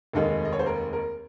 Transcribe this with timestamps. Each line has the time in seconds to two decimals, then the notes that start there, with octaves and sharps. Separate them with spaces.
0.13 F1 D#2 D#3 G#3
0.45 D#5
0.52 C#5
0.59 C5
0.66 A#4
0.93 A#4